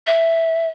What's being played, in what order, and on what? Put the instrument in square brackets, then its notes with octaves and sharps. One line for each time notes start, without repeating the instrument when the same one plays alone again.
[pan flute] E5